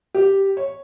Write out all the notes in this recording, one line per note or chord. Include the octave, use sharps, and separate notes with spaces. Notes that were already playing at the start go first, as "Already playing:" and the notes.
G4
C#5